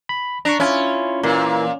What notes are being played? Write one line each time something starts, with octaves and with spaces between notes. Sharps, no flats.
B5
D4 A#5 C#6
C#4 E4 F4
A#2 E3 A#3